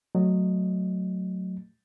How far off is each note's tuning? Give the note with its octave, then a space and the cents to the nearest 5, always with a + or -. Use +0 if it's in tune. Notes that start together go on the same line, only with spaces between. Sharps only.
F#3 +0 A3 +0 D#5 -10